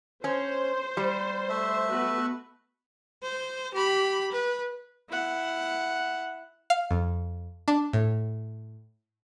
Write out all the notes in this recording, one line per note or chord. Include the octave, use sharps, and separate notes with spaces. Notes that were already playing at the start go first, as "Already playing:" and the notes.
C#4 C5
G3
A3 E5
B3 F#4 B4
C5
G4 B5
B4
E4 F#5
F5
F2
D4
A2